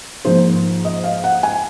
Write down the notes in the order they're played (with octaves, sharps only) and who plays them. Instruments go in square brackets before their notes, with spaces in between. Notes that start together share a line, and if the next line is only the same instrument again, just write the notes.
[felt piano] G#2 F3 A#3 C5
D#5
F5
F#5
G#5